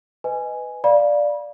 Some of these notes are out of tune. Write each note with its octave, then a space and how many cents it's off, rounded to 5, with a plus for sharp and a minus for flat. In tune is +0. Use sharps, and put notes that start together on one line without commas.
B4 +15 D#5 +0 G#5 +0
D5 +0 F5 +10 B5 -35